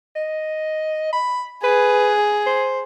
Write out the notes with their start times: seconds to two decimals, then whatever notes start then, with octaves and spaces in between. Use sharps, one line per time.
0.16 D#5
1.12 B5
1.64 G#4 B4
2.46 C5